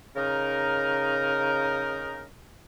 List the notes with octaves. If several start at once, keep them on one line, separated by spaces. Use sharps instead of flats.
C#3 D#4 A#4